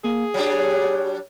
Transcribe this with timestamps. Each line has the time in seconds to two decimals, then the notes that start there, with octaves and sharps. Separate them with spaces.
0.04 A#3 G#4
0.34 F#3 G3 D4 C#5